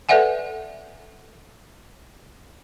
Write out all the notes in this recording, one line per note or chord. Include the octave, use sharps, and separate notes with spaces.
A4 B4 D5 E5 F#5 G#5